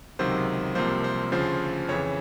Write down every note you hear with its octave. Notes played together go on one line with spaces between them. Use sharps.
C#2 C3 D#3 F#3 C5
C2 C3 F3 A#3 C5
C5
D2 C#3 F3 C5
F2 C#3 E3 C#5